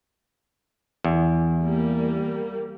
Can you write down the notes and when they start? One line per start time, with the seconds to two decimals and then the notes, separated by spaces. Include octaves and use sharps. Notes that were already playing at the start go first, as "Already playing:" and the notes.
1.04 E2
1.62 G3 A#3